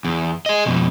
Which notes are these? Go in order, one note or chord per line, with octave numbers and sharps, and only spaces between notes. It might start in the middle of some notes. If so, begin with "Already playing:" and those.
E2
G#4 D#5
F2 B2